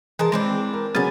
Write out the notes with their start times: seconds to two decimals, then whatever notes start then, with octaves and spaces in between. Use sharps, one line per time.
0.19 E3 G#3 A#4 A5
0.32 E3 G#3 C4 D4
0.73 A#4
0.95 C#3 F#3 B3 C#4 G#5 A6